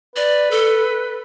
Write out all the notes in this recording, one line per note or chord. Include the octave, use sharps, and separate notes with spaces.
B4 D5
A4